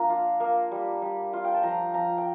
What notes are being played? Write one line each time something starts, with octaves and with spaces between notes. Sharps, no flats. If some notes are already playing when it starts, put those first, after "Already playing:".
Already playing: F3 A#3 D4 A#5
F4
A#3
G3
G3
F4
G5
A5
F3 A#5
F3 A#5
G5